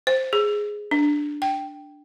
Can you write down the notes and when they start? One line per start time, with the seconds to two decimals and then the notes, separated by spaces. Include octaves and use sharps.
0.07 C5
0.33 G#4
0.91 D4
1.42 G5